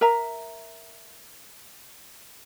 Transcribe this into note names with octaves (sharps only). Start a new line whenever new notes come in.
A#4 E5 A#5